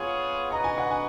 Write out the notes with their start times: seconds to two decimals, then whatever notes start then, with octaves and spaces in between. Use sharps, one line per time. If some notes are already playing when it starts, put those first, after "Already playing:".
Already playing: B3 F4 G#4 C#5 F#5
0.52 F#4 B4 D#5 A#5
0.64 G#5
0.78 F#5
0.91 G#5